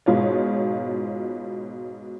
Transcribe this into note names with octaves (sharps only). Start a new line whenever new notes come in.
G#2 B2 F4 C#5